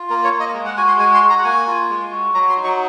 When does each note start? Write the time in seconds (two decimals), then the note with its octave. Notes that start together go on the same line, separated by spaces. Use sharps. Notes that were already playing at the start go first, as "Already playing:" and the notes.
Already playing: F4
0.10 A#3 A#4
0.24 C#5
0.33 A#3
0.40 D#5
0.54 G#3
0.65 F#5
0.77 F#4 G#5
0.88 C6
1.00 G#3 G#5
1.14 C6
1.23 F#4
1.30 A#5
1.39 F#5
1.45 A#3 G#5
1.68 F4
1.90 G#3
2.11 F#4
2.34 F#3 A#5
2.49 C6
2.57 D#4
2.64 C#6